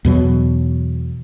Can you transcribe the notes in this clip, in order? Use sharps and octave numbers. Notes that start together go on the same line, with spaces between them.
E2 B2 F#3